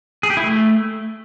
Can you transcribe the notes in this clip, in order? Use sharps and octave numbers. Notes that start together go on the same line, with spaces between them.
G#4
G4
E4
A3